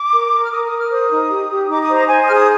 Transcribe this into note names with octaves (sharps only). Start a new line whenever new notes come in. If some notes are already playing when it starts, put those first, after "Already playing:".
Already playing: D6
A#4
A#4
F6
A#4 D#6
D#6
A#4
F6
C5 D#6
D#4
G4
G4
D#4 D6
D#6
C5
A#5
C5 G#5
D#6
G#4 F6
D#6